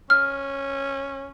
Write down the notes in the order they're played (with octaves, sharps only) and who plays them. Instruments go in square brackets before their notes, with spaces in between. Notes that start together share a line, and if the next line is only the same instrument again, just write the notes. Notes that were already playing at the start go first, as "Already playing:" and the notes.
[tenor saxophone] C#4 [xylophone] F6